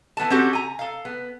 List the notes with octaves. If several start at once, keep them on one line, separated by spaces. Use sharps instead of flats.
E3 B3 A4 A5
C4 C#4 F#4 G4 A4
G#5 A#5
A4 F5
B3